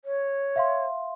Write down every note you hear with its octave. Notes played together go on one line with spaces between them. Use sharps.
C#5
E5 F5 C6